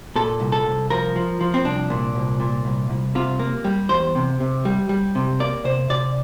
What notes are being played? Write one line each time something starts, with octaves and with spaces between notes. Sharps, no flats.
A#2 A4
C2
A4
C2
F3 A#4
F3
F3
C4
C2 D4
A#2
C2
A#2
C2
C2
C3 F4
A#3
G3
E2 C5
C3
C3
G3
G3
C3
A#3 D5
C3 C5
C3 D5